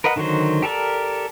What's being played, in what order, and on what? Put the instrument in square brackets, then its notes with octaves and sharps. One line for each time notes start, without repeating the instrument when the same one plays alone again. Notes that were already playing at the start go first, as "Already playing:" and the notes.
[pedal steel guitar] A#4 B4 D#5 F#5
D3 D#3 F#3 F#4 C5
G4 A4 A#4 D5